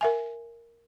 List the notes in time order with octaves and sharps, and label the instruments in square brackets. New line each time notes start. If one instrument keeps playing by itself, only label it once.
[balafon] A#4 E5 G#5